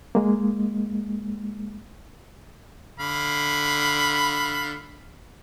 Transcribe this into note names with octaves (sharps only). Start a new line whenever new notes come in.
G#3 A#3
D3 F5 B5